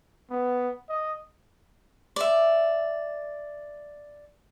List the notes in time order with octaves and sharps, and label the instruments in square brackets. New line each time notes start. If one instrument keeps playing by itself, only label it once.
[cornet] B3
D#5
[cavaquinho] D5 E5